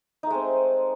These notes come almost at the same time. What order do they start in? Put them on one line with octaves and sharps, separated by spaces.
D#4 A3 G#3 C4